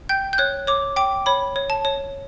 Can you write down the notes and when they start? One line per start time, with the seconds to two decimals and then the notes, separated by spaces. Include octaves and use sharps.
0.09 G5 G6
0.33 G6
0.38 C#5 F#6
0.67 C#5 D6
0.96 G5 D6
1.26 C#5 B5
1.56 C#5
1.70 A5
1.85 C#5